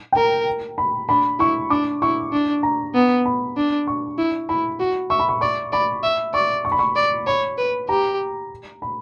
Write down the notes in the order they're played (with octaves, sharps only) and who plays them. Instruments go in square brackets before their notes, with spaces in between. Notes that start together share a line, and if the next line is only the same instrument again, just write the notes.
[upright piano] G5
[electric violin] A#4 [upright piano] A#5
[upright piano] B5
[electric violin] D4 [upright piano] B5
[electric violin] E4 [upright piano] C#6
[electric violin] D4 [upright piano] D6
[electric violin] E4 [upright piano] C#6
[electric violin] D4
[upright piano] A#5
[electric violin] B3
[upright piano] B5
[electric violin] D4
[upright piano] C#6
[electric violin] E4
[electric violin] E4 [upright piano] B5
[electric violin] F#4
[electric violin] E5 [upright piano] C#6
[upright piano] B5
C#6
[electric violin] D5 [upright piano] C#6
[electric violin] D5 [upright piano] B5
[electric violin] E5
[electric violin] D5 [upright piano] C#6
[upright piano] C#6
B5
C#6
[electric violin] D5
[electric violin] C#5 [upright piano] B5
[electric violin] B4
[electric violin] G4 [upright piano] A#5
[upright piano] B5